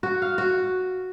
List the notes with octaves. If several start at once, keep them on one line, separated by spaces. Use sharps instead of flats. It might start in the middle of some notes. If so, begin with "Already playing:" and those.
F#4
F5
F#4